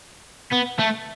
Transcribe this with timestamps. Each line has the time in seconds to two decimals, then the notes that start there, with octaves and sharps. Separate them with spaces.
0.52 B3
0.79 A3